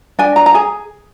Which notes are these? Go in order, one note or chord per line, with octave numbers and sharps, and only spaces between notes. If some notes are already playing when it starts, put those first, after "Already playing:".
D4 G#5
A#5
A#5
G#4 G#5